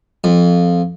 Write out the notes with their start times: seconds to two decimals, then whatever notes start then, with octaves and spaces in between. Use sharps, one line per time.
0.24 F2